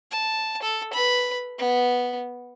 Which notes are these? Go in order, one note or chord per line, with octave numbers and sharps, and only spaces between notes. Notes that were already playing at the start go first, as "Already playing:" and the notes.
A5
A4
B4 B5
B3